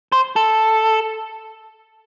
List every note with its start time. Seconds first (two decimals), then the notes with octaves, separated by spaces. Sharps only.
0.12 C5
0.36 A4